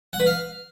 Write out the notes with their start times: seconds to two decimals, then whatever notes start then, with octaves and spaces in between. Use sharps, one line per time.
0.13 F#5
0.20 B4
0.26 F5